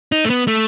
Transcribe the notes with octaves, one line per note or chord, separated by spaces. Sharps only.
D#4
A3
B3
A3